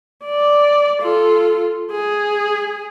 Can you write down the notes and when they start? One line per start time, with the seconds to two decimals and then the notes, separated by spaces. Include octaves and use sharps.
0.25 D5
1.02 F4 A4
1.91 G#4